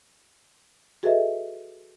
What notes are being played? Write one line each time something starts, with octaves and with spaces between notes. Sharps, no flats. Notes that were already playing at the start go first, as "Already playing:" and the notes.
F#4 G#4 A4 B4 D#5 E5